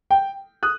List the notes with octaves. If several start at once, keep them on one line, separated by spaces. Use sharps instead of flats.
G5
D#6 F#6